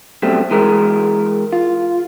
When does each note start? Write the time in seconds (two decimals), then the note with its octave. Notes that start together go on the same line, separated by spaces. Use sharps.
0.22 F#2 B2 G3 A3 C4
0.51 E3 G#3 A#4
1.53 F4